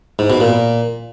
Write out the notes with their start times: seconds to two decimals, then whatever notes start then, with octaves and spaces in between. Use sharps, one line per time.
0.19 G#2
0.30 B2
0.40 A#2